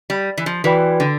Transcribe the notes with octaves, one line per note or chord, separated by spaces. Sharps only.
G3
E3
F3
E3 F#4 B4 D5 G5
D3